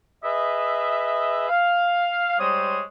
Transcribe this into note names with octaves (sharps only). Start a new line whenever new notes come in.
G#4 B4 D#5 E5
F5
G3 G#3 C5 C#5 D#6